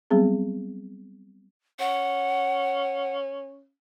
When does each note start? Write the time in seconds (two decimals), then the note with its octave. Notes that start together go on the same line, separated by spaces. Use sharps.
0.11 F#3 G3 B3 C4 G#4
1.80 C#4 F#5